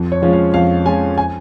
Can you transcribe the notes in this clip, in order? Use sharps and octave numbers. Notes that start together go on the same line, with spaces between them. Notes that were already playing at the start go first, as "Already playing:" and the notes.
Already playing: F2
C#5
F3 G#3 C#4 F4
F5
F2 F5
F3 G#3 C#4 F4 G#5
G#5